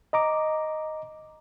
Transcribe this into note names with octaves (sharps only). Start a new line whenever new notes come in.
D#5 A#5 D6